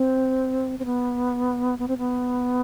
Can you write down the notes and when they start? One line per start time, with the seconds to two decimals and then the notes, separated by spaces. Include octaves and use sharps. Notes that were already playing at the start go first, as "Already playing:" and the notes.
Already playing: C4
0.79 C4
0.85 B3
1.79 B3
1.88 C4
1.98 B3